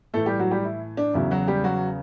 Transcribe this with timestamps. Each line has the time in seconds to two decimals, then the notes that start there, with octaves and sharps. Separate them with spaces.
0.14 A2 E3 A3 A4
0.26 G3 G4
0.39 F#3 F#4
0.51 G3 G4
0.64 E4
0.97 D4
1.14 E2 C#3 F#3 E4
1.31 F#3 F#4
1.48 G3 G4
1.64 F#3 F#4